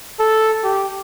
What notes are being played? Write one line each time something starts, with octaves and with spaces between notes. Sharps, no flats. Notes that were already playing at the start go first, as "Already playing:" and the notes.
A4
G4